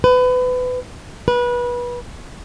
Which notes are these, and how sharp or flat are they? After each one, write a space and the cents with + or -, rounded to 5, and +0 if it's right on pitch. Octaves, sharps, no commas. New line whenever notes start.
B4 +25
B4 -25